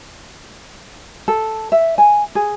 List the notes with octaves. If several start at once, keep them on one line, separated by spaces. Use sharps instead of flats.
A4
E5
G#5
G#4